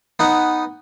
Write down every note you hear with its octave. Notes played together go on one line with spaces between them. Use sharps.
B3 D#4 F#5